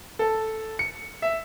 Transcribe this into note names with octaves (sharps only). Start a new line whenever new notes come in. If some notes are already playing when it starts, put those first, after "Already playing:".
A4
C#7
E5